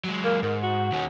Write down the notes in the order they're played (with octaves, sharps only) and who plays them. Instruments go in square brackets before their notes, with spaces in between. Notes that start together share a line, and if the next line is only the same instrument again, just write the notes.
[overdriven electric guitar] F#3 G#3
[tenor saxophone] A#3
[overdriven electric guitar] G#2 [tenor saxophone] D#3
[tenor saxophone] F#4
[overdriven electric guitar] D#2 C#4